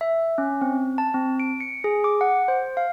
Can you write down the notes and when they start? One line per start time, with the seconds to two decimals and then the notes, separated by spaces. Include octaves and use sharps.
0.01 E5
0.38 C#4
0.61 C4
0.98 A5
1.14 C4
1.40 D7
1.60 C#7
1.84 G#4
2.04 D6
2.21 F#5
2.48 C5
2.77 F5